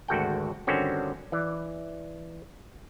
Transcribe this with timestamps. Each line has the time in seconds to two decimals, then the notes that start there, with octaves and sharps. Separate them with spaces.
0.08 G#1 D2 F#4 A4 F#5 G5
0.67 G2 D3 D#3 C4 C#4 F#4
1.32 E3 D5